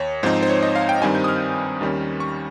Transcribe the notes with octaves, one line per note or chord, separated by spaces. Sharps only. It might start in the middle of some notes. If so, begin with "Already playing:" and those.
Already playing: D#2 C#5
G#2 F3 C4 D#4 C5
C5
C#5
D#5
F5
G5
G2 D#3 G3 C4 D#4 G#5
G6
D#6
F6
D#2 D#3 G3 C#4
C#6